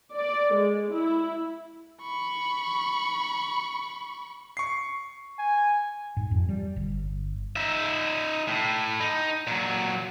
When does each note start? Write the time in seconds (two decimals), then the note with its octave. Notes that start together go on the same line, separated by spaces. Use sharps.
0.15 D5
0.54 G#3
0.93 E4
2.02 B5 C#6
4.57 C#6 C7
5.39 G#5
6.17 G#2
6.31 F2
6.49 G3
6.76 G1
7.56 D#4 E5
8.48 A2
9.01 D#4
9.47 A#2 F#3